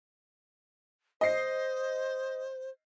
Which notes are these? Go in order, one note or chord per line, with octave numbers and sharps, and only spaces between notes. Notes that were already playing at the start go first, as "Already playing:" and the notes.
C5 D#5 C7